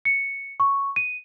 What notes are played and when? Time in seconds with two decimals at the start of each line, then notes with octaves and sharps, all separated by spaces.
0.05 C#7
0.60 C#6
0.96 D#7